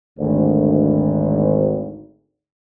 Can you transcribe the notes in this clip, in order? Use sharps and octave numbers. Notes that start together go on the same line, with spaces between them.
G#1 D2